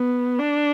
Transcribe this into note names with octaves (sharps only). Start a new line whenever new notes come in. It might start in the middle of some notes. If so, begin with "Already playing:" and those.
Already playing: B3
D4